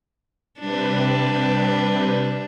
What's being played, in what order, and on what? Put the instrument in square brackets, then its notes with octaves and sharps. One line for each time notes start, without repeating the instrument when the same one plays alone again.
[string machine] C3 G3 B4 [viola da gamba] D4